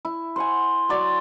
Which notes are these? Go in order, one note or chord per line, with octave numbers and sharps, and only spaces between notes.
E4
C5 F#5 G#5
F#3 D5 C6